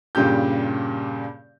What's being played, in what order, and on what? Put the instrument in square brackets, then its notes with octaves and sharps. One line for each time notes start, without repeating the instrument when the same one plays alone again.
[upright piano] G2 A#2 C#3 G4 G6